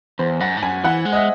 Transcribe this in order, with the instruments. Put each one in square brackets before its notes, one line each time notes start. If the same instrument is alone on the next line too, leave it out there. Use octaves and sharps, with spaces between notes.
[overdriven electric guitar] E2 [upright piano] C5
[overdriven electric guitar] F#2 [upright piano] F#5
[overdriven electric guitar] G#2
[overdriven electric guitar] F#2 [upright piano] G#5
[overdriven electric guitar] E3 [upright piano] F#5
[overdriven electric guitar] G#3
[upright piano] D#5
E5